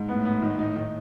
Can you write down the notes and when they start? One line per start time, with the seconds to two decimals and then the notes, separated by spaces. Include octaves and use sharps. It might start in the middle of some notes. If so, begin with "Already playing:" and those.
Already playing: G#2
0.09 A2 B3
0.25 B3
0.42 D#3
0.59 D#4
0.76 D#3